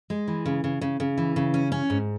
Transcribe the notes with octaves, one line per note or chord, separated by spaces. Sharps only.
G#3
E3
C#3
C#3
C#3
C#3
E3
C#3
C#4
C#4
G#2